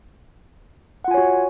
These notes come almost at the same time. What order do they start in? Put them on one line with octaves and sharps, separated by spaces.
F#5 F4 G#5 C#5 F#4